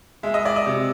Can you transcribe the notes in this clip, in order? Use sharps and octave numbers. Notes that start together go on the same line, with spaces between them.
G#3 E5
D#5
D5
D#5
C3